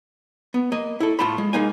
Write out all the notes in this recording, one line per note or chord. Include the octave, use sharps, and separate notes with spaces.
B3
A#3 D#5
E4 A4
A2 A3 F4 A5 B5
G#3
G#3 A#3 D#4 G#5